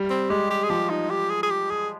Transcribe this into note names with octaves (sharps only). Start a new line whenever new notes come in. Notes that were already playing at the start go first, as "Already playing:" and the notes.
Already playing: G3
C4
G#3 G4
G4
G#4
F3 G4
D#4
G4
G#4
G#4
G4
G#4